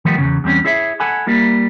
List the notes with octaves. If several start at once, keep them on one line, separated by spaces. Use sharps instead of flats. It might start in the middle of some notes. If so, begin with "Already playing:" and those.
D#3 F3 G3 A3 B3
E2 G#2 C#3
E2 G3 C4 C#4
E4 G#4 C#5 E5
A4 F#5 G#5 B5
G3 A#3 E4